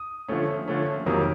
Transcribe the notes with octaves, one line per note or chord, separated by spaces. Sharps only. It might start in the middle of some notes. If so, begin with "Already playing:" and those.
Already playing: D#6
D3 F3 A3 C#4
D3 F3 A3 C#4
F2 C3 D#3 F#3 A#3 D#6